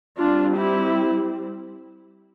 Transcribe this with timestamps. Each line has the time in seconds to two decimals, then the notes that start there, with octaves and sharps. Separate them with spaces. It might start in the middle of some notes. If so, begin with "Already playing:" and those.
0.19 G3 C4 D4 F4
0.57 E4 G4